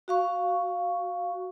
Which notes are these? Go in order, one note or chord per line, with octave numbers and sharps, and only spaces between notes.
F#4 F5 C#6